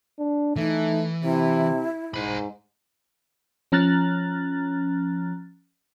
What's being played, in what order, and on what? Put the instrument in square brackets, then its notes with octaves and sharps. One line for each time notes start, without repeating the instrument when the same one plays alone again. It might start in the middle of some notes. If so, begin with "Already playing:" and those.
[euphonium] D4
[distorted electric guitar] E3 [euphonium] A3 [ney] D#4
[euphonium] C3 [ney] E4
[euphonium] G#2 [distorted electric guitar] C5 B5
[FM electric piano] F3 C#4 A#5 F6 F#6 A6